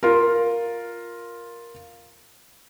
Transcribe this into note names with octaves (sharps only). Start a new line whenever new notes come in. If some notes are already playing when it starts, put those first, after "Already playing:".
F4 A#4